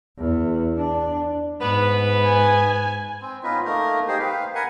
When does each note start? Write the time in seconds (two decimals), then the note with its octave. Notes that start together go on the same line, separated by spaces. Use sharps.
0.18 E2
0.77 D4
1.61 G#2 B3 B4
2.25 G#5
3.21 C4
3.43 B3 C#4 D#4 F4 B4
3.65 A3 A#3 D#4 A#4
4.08 D#4 G4 G#4 C5
4.19 B4 F5
4.55 A#4 B4 F#5 G#5